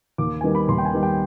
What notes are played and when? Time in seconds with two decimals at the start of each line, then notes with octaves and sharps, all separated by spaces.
0.18 D#2 D6
0.41 D#3 G3 B3 G#5
0.55 B5
0.69 D#2 C6
0.78 G5
0.85 G#5
0.93 D#3 G3 B3
1.03 G5